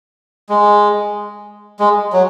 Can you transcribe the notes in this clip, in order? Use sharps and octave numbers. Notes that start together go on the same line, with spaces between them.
G#3
G#3
F#3